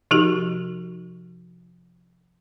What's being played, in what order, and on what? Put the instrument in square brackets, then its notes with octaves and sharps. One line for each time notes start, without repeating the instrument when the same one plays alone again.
[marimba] C3 F3 D#4 F#4 G4